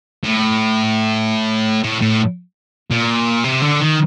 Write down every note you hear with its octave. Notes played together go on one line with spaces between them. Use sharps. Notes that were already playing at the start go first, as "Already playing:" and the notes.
A2
A2
A2
A#2
C3
D3
D#3